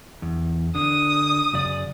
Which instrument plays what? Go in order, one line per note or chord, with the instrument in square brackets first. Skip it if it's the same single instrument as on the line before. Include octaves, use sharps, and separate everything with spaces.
[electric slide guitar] E2
[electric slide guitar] D3 D4 [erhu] D#6
[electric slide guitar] F#2 C#3 D5